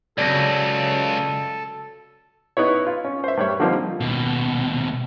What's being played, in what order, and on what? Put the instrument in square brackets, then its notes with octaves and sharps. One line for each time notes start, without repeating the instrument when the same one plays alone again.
[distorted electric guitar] C#2 [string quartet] C#3 F#3 [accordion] A4 [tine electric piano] D5 A#6
[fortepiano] B3 D#4 E4 C#5
F4
C#4
C5 E5
G2 G3 C#5
D3 F3 G3 A#3 C4 D#4
[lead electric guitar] D#2 B2